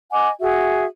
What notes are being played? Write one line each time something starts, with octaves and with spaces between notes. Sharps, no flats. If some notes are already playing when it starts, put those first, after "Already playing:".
D#5 F#5 G#5 D6
F#4 G#4 E5